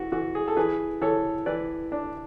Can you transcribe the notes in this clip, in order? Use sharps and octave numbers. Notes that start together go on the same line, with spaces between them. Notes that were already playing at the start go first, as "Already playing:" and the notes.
Already playing: E3 F#4
E3 F#4
G#4
A4
E3 G#4 B4
E3 A4 C#5
E3 B4 D5
D4